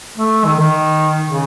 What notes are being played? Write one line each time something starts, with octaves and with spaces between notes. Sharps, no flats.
A3
D#3
D#3
C#3